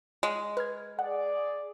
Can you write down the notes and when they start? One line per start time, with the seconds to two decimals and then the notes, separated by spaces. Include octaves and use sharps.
0.23 G#3
0.57 B4 F6 G#6
0.99 G#4 D5 F#5